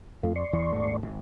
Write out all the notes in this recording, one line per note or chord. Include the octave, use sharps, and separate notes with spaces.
F2 A3 F4
D5 C6 C#6
E2 E3
D#1 G#2 A3
G#1